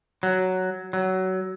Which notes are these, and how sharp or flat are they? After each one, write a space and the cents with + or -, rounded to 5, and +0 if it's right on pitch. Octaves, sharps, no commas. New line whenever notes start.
F#3 +5
F#3 +20